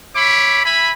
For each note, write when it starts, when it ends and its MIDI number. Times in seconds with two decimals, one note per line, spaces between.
0.15 0.63 73
0.15 0.63 76
0.15 0.63 83
0.15 0.63 86
0.65 0.91 76
0.65 0.91 80
0.65 0.91 83